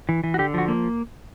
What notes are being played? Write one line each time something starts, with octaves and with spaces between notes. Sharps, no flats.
E3
E3
F#4
D3 G4
F3 F#4
A#3